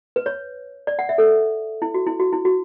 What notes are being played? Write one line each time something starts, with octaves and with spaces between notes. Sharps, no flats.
B4
C#5
D5
F#5
E5
A4
E4
F#4
E4
F#4
E4
F#4